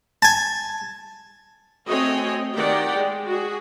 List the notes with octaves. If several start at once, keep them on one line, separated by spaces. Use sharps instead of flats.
G#5 A5
A3 C4 F#4 C#5 D#5 G#5
D#3 G4 D5 F#5 G5
G#3
F#4 G#4